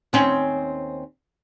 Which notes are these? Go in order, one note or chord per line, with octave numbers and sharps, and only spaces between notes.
D#2 C4 C#4